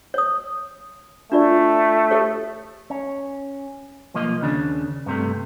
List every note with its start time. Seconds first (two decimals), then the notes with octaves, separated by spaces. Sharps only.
0.14 C#5 D#6
1.32 A3 D4 F4 D5
2.11 G4 A4 C#5
2.90 C#4
4.14 B1 F3 A#3 D#5
4.41 D#2 C#3 D4
5.06 G2 C3 A3